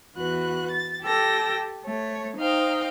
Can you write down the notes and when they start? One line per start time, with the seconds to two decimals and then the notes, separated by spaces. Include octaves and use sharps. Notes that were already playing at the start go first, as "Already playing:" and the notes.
0.15 E2 F#4 B4 F#6
0.69 A6
1.01 G4 A4 G5 E6 A#6
1.83 A3 C#5
2.36 D#4 C5 D#5 F5 G5